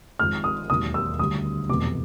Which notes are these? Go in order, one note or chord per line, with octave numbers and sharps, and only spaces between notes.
G#1 G#2 F3 G#3 F6
D#6
E1 D#2 D#3 F#3 D#6
E6
D2 D3 G3 D#6
F1 E2 B2 F#3 A3 D6